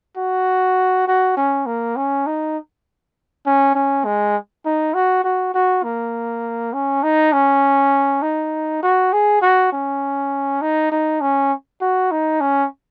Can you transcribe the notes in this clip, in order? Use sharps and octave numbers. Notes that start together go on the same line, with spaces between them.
F#4
F#4
C#4
A#3
C#4
D#4
C#4
C#4
G#3
D#4
F#4
F#4
F#4
A#3
C#4
D#4
C#4
D#4
F#4
G#4
F#4
C#4
D#4
D#4
C#4
F#4
D#4
C#4